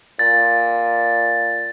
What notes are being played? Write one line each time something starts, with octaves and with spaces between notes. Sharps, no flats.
A#2 A6